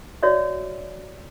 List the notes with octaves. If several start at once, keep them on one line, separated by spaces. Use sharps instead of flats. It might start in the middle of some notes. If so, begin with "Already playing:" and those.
F#4 C#5 D5 E5